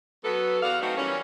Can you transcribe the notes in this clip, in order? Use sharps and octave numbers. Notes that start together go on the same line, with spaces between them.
F#3 B3 A4
E2 F#4 D5 F5
F#3 A3 B3 C4 D#4 F#4
E3 G3 A#3 C#4